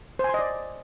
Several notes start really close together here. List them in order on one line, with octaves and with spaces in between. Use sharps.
C5 G#5 C6 D#5 D5